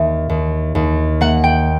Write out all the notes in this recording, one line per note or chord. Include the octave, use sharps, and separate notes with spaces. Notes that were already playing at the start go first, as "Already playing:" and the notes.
Already playing: D#2 A#3 E5
D#2
D#2
A#3 F#5
G5